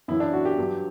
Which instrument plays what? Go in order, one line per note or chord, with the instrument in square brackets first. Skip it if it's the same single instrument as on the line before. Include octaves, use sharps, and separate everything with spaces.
[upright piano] F#2 E3 E4
D4
F#4
G4
G2 F#3